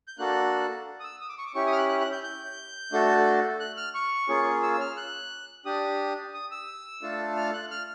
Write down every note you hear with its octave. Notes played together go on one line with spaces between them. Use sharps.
G6
A#3 D4 F#4 A4 F#6
D#6
E6
D#6
D6
C#6
D6
C#4 E4 G4 C#6
D#6
F6
F#6
F#6
F#6
G6
G6
A3 D4 F#4 A4
F#6
F6
C#6
A#3 C#4 F4 G#4
E6
E6
F6
F#6
D4 G4 D#6
D#6
E6
A3 D4 F4 A4
F6
F#6
F6